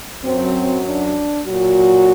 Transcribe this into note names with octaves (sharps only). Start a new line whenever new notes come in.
F#2 F#3 C4
D4
A#2 F#3 F#4